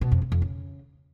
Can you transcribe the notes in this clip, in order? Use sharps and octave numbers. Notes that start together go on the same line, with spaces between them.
B2
F2
C3
F2
C#3